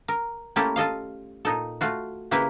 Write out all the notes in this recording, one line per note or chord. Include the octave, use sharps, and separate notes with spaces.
A#4
A3 A#3 C#4 E4 G4 A4
F4 A4 D#5 F5
A#2 D#4 A4
A3 F4 F#4
C#3 A#3 E4 G4 B4